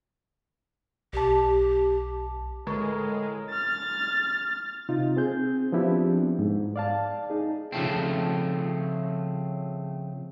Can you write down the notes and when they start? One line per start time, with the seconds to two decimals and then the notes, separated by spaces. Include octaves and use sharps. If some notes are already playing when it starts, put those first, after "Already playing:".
1.13 B1 G4 A5
2.67 A2 D3 G#3 A#4 C#6
3.49 F6 A6
4.89 C3 D#4 F4
5.17 C4 G#4 G6
5.72 F3 B3 C4 D4 E4 G4
6.39 G#2
6.76 D5 F5 A5
7.30 D#4 G#4
7.72 C#3 F3 A3 C4